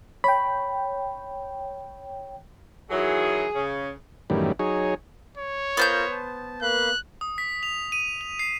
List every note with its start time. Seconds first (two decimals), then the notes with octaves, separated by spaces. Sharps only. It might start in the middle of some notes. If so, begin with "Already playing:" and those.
0.24 C#5 G5 B5
2.90 D#3 E3 F#3 G#4
3.55 C#3
4.30 F#2 A2 D#3 E3 G3
4.59 F#3 D#4 G#4 C#5
5.37 C#5
5.77 B3 F4 A#4 C5 G6
6.12 A5
6.62 A#3 B4 F5 F#6
7.21 D#6
7.38 B6
7.63 F7
7.92 D#7
8.21 F7
8.39 C7